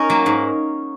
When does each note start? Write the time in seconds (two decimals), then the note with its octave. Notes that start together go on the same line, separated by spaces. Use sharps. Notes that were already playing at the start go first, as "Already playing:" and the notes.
Already playing: C#4 D#4 A#4
0.10 F#3 A#3
0.26 G#2